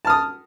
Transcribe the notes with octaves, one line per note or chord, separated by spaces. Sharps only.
A5 D#6 F6